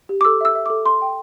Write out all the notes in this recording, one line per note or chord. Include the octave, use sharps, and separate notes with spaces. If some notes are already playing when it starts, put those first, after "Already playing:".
G4
D6
A4 E6
E5 E6
E5
A4 D6
A4 C6
G5